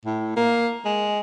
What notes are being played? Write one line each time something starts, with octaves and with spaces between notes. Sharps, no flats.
A2
A#3
G#3